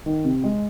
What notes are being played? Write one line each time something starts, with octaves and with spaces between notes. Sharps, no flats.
D#3
C3
G#3